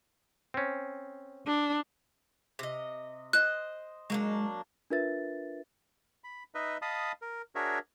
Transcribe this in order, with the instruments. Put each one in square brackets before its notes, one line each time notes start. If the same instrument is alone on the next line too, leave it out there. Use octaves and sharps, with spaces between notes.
[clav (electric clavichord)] C4 C#4
[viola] D4
[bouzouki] C3 D#5
[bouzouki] C5 D#5 [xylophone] F#6
[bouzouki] F#3 A#3 D4 [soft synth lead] G#3
[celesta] D4 F4 A#4 B4 E5 A6
[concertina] B5
D#4 B4 D#5 E5
D#5 F5 A5 B5 D#6
A#4
D4 F#4 G#4 A#4 C#5 E5